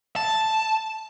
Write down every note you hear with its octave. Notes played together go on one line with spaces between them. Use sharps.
A5